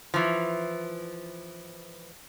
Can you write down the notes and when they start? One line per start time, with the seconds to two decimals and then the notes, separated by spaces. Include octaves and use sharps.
0.14 E3 F3